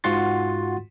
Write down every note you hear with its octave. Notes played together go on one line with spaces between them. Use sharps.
G#2 F4 F#4 F#5 C6 A6